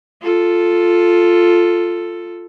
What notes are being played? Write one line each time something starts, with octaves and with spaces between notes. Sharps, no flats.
F4 A4